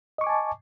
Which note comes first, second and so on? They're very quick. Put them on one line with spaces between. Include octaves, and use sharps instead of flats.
D#5 C#6 D6 G#5 A5